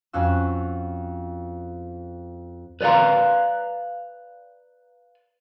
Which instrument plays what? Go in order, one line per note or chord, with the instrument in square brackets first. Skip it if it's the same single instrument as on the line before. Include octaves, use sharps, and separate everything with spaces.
[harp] F2 C#4 F#4 F5 E6
[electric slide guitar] B4 D5 D#5 F5 A#5